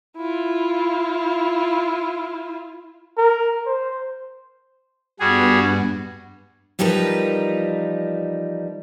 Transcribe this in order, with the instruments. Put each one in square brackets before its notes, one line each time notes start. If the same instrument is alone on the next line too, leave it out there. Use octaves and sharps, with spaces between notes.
[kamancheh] E4 F4
[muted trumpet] A#4
C5
[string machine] G2 B3 [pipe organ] G3 F#4 G#4
[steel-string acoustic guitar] E3 F3 G3 D#4 A#4 B4